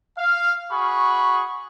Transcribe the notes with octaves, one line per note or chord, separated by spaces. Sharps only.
F5
F#4 G#4 B5 C#6